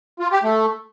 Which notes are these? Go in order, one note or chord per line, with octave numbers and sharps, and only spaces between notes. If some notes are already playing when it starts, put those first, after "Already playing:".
F4
G4
A3